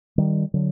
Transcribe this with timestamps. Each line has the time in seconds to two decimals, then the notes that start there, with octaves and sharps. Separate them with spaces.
0.18 D#3 G3
0.54 D3 F#3